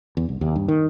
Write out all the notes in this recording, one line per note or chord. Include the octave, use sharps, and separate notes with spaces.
E2
C2
D#2
G2
D#3